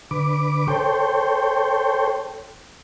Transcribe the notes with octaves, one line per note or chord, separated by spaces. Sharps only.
D3 B4 D6
A4 C5 C#5 G5